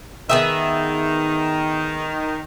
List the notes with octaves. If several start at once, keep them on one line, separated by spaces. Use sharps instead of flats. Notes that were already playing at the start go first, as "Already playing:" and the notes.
D#3 B3 G#4 E5